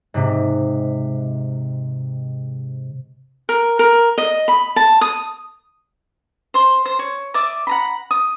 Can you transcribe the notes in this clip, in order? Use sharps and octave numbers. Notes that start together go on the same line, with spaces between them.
G#2 C3
A#4
A#4
D#5
B5
A5
D#6
C5 C6
C5
C#5
D5 E5 D6 D#6
F#5 A#5 B5
D#6